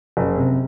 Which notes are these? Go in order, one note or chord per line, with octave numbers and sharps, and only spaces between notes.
F#1
C3